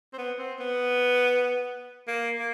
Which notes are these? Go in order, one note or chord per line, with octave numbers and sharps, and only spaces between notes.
C4
B3
C4
B3
A#3
A#3